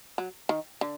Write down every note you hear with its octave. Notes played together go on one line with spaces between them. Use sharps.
F#3
D#3
D3